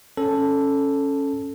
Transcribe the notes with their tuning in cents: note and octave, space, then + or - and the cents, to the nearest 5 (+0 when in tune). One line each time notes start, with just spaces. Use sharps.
C#4 -5 A4 +0